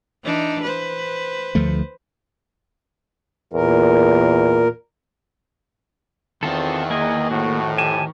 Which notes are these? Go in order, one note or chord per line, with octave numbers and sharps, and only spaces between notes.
E3 D4 D#4
B4 C5
D2 F3 A3
E2 A#2 A#4
E2 D#3 C4 F4 A4
A#3 G#4 D#5 G#5
F2 A2 F#4
G4 G#5 A5